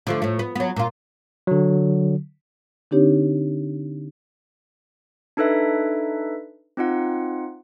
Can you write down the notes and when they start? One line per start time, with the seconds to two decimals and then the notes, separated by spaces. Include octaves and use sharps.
0.07 D3 F3 A3
0.22 A2 A3
0.39 B3
0.55 F#3 B3
0.76 A#2 F4
1.47 D3 F#3
2.91 D3 C4 D4 D#4 G4 C#5
5.37 D4 D#4 A4 B4 E5
6.77 C4 D#4 F4 F#5